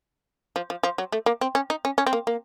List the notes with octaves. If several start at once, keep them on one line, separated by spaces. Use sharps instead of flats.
F3
F3
F3
F#3
A3
A#3
C4
C#4
D#4
C#4
C#4
C4
A#3
A#3